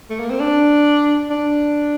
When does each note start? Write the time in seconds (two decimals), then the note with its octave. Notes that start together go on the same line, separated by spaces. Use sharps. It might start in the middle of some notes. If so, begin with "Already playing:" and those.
0.10 A3
0.20 A#3
0.30 C4
0.40 D4
1.30 D4